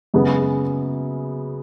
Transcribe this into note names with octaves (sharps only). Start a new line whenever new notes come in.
F#2 C#3 G#3 B3